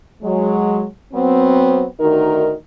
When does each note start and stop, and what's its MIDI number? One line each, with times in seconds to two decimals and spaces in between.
0.22 0.85 54
0.22 0.85 56
1.14 1.85 54
1.14 1.85 59
1.14 1.85 60
1.99 2.54 38
1.99 2.54 51
1.99 2.54 63
1.99 2.54 66
1.99 2.54 70